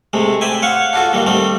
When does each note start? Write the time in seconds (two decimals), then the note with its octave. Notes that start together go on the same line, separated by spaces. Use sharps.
0.13 C3 G#3 A3
0.41 C5 D5 E5 G5 G#5
0.62 C#5 F5 F#5 C#6
0.93 D4 F4 F#4 A4
1.13 D#3 G3 A#3
1.27 D#3 G3 A3 C4 D5